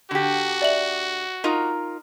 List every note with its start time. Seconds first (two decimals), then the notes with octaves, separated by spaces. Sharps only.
0.11 D3 F#4 G4
0.62 D5 E5 F#7
1.44 D#4 F4 A#4